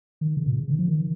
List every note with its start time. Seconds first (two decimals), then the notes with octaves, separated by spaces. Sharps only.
0.21 D#3
0.37 C#3
0.46 A#2
0.53 C#3
0.69 D#3
0.79 F3
0.88 D#3